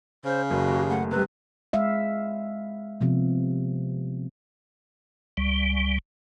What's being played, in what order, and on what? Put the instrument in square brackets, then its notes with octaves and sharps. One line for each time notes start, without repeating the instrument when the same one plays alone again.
[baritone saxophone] C#3 [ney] C5
[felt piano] F#1 [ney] F#4
[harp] D#2
[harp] A3 [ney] F#5
[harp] C3 G3 [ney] B4
[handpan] G#3 E5 F5
C3 F3 B3
[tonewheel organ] C#2 G3